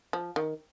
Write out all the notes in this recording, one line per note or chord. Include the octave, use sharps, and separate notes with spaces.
F3
D#3